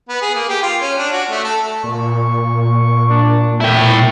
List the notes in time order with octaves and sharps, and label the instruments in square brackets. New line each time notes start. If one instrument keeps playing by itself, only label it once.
[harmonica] B3
G#4
A#3
G4
F4
C#4
D4
F#4
A3
A4
[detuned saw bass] A#2 [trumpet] C#6
[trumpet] D4
[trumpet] A3 [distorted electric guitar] E4 G5